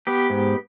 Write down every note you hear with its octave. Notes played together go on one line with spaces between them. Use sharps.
B3 G4
G#2